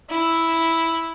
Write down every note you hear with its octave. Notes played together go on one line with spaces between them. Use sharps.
E4